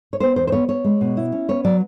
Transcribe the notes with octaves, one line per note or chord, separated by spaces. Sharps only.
C#5
B3 C5
E2 C5
C5
B3 C#5
B3 C#5
G#3
B2
E4
C#4
B3 C#5
F#3 D5